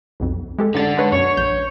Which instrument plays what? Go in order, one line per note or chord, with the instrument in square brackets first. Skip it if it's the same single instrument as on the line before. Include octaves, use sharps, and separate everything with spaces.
[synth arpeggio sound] B1 F2
G#3 G4 A4
[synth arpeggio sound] G#2 A6 [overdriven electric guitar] D3 D4
[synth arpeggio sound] G#3 B4 C#5
[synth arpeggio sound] F#2 B2 [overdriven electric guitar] C#5
[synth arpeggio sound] A#1 G6